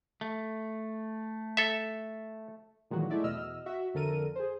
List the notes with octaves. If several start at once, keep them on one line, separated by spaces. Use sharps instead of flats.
A3
A4 E5
A#2 D#3 E3 F#3 G#3 F#4
G#3 A3 E4 D5 E5
E2 B2 D#5 E6 F6
F#4 E5
F2 D3 A4 A#4 D#7
G#4 C5